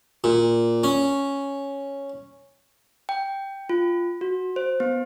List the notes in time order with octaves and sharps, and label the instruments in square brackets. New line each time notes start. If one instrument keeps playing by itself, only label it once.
[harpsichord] A#2
C#4
[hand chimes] G5
F4
F#4
C5
B3